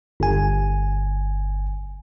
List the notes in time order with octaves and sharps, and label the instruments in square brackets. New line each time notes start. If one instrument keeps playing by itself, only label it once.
[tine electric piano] G1 G#5